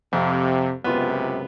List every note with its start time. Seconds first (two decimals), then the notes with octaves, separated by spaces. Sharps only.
0.13 F2 C3
0.84 C#2 F#2 C3 B3 F4